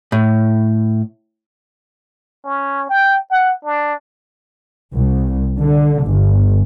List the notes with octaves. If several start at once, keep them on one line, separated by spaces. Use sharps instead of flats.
A2
C#4
G5
F#5
D4
C2
D3
G1